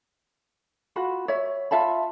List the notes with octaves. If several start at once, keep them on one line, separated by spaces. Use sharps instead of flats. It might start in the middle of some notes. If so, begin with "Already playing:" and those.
F4 F#4 B5
C#5 E5
F4 E5 A5 B5